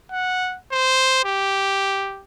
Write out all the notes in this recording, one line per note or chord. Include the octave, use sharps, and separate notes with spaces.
F#5
C5
G4